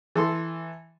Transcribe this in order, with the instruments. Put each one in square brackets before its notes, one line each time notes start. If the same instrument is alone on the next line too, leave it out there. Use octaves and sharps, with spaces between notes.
[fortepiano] E3 A4 C6